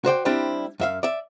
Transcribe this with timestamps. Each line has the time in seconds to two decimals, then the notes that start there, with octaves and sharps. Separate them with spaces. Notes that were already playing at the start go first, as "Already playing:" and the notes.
0.05 F#4 C5 D5 G5
0.25 G3 C4 D4 E4 G4 C5
0.80 F#2 E5 F5
1.03 D5 E5